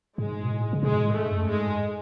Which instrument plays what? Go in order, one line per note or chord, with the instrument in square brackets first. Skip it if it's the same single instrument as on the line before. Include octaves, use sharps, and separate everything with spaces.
[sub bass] G#2 [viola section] G#3
[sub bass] B2
A2
C#3
[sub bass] B2 [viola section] G#3
[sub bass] G#2
A2
[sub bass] G#2 [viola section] A3
[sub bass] F#2
[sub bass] G#2 [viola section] G#3